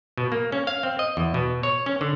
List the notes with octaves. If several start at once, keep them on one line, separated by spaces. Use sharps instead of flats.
B2
A#3
C#4
F5
C4
D#5
E2
B2
C#5
C#4
D3